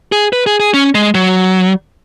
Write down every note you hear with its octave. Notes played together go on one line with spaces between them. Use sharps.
G#4
B4
G#4
G#4
C#4
G#3
F#3